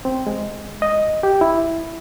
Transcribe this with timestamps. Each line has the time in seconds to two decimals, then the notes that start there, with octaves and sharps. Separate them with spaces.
0.05 C4
0.27 G#3
0.82 D#5
1.23 G4
1.41 E4